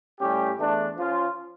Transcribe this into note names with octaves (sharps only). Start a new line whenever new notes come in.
A2 G3 C#4 G4
E2 E3 A3 D4
F3 C#4 F4